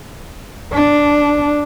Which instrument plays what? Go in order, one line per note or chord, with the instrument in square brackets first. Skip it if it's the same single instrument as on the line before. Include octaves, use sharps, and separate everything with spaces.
[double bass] D4